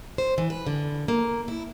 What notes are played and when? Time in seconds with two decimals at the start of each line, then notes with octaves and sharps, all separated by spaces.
0.18 C5
0.38 E3
0.50 B4
0.67 D3
1.08 A#3
1.48 E4